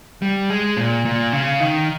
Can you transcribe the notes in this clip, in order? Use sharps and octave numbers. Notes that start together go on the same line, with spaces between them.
G3
G#3
A#2
A#2
C#3
D#3